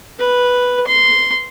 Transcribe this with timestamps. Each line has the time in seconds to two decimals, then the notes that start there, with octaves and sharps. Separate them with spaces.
0.19 B4
0.87 C6